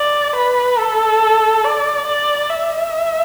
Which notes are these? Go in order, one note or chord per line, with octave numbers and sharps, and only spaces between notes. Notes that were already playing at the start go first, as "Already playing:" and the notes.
Already playing: D5
B4
A4
D5
D5
E5